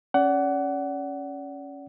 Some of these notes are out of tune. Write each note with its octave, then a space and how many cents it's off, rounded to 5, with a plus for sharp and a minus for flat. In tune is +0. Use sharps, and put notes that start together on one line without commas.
C#4 +0 D5 -30 F#5 +20